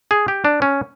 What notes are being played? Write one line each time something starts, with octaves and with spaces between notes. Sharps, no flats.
G#4
G4
D4
C#4